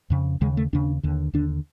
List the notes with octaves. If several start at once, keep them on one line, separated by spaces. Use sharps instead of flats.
F2 C#3
D#2 C#3 G#3
A3
D#2 C#3 D4
D#2 D3
D#2 D3 D4